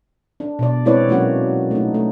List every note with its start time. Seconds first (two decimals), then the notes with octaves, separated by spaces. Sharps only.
0.40 D4
0.59 B2 D5
0.85 G#3 C4 E4 B4 C#5 D5
1.09 F#3 G#3 A#3 C#4 F#4
1.71 A3 D#4
1.94 A3